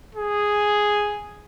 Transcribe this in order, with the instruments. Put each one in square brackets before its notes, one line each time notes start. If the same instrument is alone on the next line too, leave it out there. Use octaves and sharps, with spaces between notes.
[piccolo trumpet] G#4